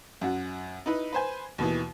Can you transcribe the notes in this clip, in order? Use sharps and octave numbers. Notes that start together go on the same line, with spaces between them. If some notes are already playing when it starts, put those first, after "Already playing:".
F#2 F#4
D#4 E4 B4
B4 C5 G#5
D#2 B2 E3